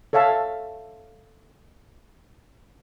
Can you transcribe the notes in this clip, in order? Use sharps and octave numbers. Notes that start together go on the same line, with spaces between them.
A4 C#5 E5 F5 A5